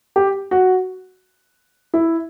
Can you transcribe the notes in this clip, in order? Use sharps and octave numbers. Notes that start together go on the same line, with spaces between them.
G4
F#4
E4